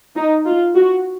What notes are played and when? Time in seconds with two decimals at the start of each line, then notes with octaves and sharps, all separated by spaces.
0.15 D#4
0.45 F4
0.76 F#4